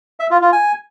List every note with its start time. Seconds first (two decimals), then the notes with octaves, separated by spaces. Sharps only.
0.20 E5
0.31 F4
0.41 F4
0.52 G#5